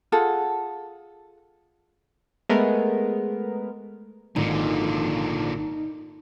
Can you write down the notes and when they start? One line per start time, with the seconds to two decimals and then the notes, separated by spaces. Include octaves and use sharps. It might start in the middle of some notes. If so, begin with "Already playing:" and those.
0.12 F4 G#4 A4 F#5
2.49 G#3 A3 B3 A#4
4.36 G#1 A#2 D3 D#3 D#4